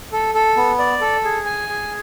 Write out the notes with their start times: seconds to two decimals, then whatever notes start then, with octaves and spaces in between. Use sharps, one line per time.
0.13 A4
0.34 A4
0.57 B3
0.79 D5
1.01 A4
1.24 G#4
1.46 G#5
1.69 G#4